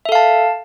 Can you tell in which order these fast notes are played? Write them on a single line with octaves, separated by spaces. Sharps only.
E5 A4 F5 A5